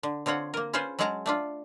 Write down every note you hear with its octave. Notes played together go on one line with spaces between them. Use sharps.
D3
D3 C4 F4 C#5 F#5
A#3 A#4
C#4 F4 G#4 B4 C5 G#5
F#3 G#3 C#4 G#4 A5 A#5
A3 D4 F4